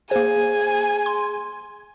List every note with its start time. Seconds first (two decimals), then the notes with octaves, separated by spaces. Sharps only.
0.11 A#3 G#4 C5 G#5
1.06 C6